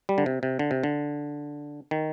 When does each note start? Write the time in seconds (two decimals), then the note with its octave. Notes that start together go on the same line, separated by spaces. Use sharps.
0.09 G3
0.18 D3
0.26 C3
0.43 C3
0.59 D3
0.71 C3
0.83 D3
1.91 D#3